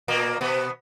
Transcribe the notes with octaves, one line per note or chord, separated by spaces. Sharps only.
A#2 A#3
B2 B3